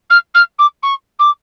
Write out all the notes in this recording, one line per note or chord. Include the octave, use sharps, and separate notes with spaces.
F6
F6
D6
C#6
D6